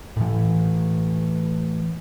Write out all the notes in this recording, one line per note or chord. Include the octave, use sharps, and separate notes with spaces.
A2 E3